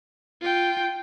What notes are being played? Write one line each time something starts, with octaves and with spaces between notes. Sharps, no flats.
F4 G5